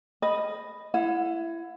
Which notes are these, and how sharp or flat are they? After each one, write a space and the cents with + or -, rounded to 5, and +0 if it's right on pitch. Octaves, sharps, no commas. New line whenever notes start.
D#5 +0 B5 +0
E4 +20 F#5 -30